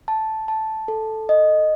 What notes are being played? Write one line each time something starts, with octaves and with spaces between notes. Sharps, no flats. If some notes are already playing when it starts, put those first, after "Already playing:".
A5
A5
A4
D#5